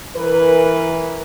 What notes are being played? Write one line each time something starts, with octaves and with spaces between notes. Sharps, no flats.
E3 A#4 B4